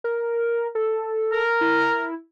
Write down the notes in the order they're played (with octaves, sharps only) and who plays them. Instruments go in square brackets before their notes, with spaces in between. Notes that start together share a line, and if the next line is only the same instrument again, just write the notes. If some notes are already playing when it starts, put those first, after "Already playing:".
[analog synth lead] A#4
A4
[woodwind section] A#4
[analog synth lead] E4